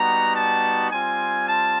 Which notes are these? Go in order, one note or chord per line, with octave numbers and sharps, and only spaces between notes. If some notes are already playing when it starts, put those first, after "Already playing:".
Already playing: G3 B3 D#4 F#4 A#5
A5
G3 C4 F4 G#5
A5